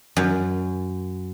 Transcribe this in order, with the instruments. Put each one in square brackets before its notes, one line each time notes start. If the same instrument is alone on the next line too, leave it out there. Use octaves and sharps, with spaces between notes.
[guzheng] F#2